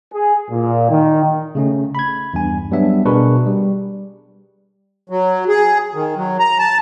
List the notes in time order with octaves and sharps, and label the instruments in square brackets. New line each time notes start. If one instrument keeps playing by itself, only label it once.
[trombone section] G#4
A#2
D#3
[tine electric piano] C#3 A3 C#4
B5 G#6
E2 G2 G#5
F#3 G3 B3 D4 E5
B2 D4 G#4 A#4 B4 C#6
G3
[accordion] F#3
G#4
D#3
F#3
A#5
A5